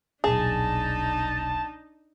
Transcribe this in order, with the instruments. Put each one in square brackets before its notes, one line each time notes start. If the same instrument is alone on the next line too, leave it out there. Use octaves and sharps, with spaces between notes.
[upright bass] D#1 B1 [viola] D4 D#4 [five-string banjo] G#4 [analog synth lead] A5